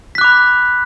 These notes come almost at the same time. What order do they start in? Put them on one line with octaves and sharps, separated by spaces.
B6 F#6 D6 B5